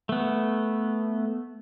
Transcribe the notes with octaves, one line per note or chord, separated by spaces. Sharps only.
A3 B3